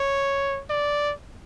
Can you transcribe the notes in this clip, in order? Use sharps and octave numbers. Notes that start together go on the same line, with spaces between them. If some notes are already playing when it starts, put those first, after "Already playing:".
Already playing: C#5
D5